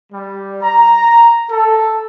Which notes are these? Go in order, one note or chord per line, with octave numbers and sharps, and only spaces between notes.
G3
A#5
A4